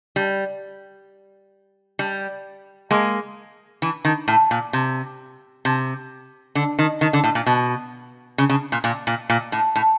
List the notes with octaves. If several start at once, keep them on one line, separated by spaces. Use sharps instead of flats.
G3
G3
G#3 A#3
E3
D#3
A2
A#2
C3
C3
D3
D#3
D#3
D3
A2
A#2
B2
C#3
C#3
A#2
A#2
A#2
A#2
A2
A2